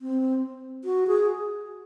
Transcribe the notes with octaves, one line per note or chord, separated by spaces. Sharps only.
C4
F#4
G#4